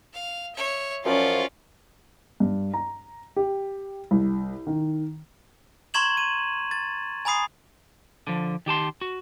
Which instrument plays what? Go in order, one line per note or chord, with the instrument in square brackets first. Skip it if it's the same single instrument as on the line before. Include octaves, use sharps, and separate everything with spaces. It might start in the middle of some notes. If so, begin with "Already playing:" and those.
[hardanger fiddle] F5
C#5 E5
[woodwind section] F#2 F3 [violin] C#4 F4 [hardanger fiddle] D5
[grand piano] G2
A#5
G4
C2
D#3
[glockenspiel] A#5 C6 C#6 G#6 E7 F#7
D#7
A6
G#5 A#5 B5 D#6 C7
[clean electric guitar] D3 F3
D#3 G4 A5 C6
F#4